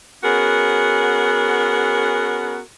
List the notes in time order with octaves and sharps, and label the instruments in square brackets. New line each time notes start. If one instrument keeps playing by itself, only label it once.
[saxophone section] B3 C#4 F#4 G#4 A#4